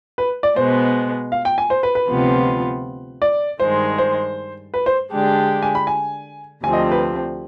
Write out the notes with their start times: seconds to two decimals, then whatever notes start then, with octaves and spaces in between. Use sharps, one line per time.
0.18 B4
0.43 D5
0.56 B2 G#3 B3 C5
1.32 F5
1.45 G5
1.58 G#5
1.70 C5
1.83 B4
1.95 B4
2.07 D2 C3 F3 B3 F4
3.22 D5
3.60 G2 D#3 G#3 C5
3.98 C5
4.74 B4
4.86 C5
5.11 D3 G#3 D4 G4
5.62 G#5
5.75 B5
5.87 G#5
6.64 D2 C3 F3 C4 G#5
6.73 D#5
6.91 B4